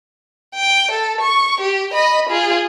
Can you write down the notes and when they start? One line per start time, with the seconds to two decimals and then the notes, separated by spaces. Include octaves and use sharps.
0.55 G5
0.91 A4
1.21 C#6
1.60 G4
1.93 D#5 B5
2.29 F4 G#4